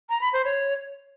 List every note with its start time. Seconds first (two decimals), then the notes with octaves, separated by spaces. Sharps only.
0.10 A#5
0.21 B5
0.33 C5
0.45 C#5